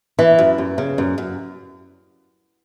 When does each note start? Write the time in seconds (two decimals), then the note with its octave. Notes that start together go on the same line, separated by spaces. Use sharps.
0.19 E3
0.38 F#2
0.58 F#2
0.78 C#3
0.98 F#2
1.18 F#2